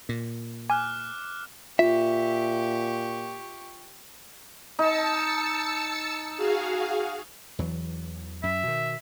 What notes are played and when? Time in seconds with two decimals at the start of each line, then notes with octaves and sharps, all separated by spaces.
0.09 A#2
0.70 G#5 D6 F6 F#6
1.79 A#2 F4 G4 E5 C#6
4.79 D#4 A5 E6 C#7
6.36 F#4 G#4 F5
7.59 E2 E3 F#3
8.43 F#2 E5
8.64 B2 D#3